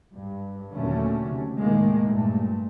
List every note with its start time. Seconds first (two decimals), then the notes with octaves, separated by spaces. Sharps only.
0.16 G2
0.73 D#2 A#2 D3 F#3 A3 C#4
1.26 C3
1.59 A2 D#3 G#3 A#3
2.08 G2 A#2 A3